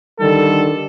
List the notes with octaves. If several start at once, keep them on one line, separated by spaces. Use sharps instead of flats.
D3 D#3 G3 A4